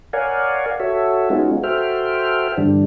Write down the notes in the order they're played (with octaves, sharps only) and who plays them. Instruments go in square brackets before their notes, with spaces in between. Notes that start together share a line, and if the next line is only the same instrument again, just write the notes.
[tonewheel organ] A#4 C#5 D5 F5 F#5 G#5
F#4 A4 C#5 E5
G#3 B3 C#4 D#4 F4 F#4
F#4 A4 C5 E5 G5 F6
G2 D3 E3 G3 D4